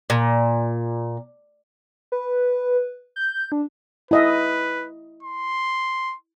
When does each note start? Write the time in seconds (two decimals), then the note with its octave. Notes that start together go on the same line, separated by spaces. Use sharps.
0.10 A#2
2.12 B4
3.16 G6
3.52 D4
4.11 E4 B4 D#5 E5
5.23 C6